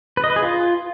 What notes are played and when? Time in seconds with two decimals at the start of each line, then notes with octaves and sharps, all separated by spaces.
0.17 B4
0.24 D#5
0.30 B4
0.36 G#4
0.43 F4